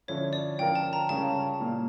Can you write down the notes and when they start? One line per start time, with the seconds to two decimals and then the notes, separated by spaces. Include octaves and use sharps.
0.08 D3 F3 C#4 E4 A4 C#5
0.33 D5
0.59 D3 F3 C#4 F4 A#4 G5
0.75 A5
0.93 A#5
1.09 C#3 G3 C#4 F4 A5
1.60 A#2 G3 A#3